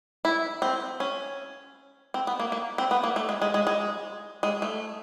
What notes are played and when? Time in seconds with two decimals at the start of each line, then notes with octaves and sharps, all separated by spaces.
0.25 E4
0.62 C4
1.00 C#4
2.14 C4
2.27 B3
2.40 A#3
2.52 A#3
2.78 C4
2.91 B3
3.03 A#3
3.16 A3
3.29 G#3
3.42 G#3
3.54 G#3
3.67 G#3
4.43 G#3
4.62 A3